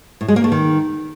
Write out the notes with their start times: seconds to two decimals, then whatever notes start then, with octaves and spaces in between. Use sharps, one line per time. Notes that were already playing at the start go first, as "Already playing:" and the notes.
0.21 A2
0.28 G#3
0.36 A#3
0.44 A3
0.52 D#3